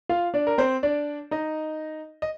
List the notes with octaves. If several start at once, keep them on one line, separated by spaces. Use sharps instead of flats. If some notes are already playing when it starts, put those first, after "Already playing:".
F4 F5
D4 D5
A#4
C4 C5
D4 D5
D#4 D#5
D#5